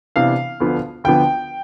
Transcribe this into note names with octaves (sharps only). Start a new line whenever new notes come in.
C3 E3 B3 D4 F5
D2 D3 F3 B3
D2 D3 F3 B3 G5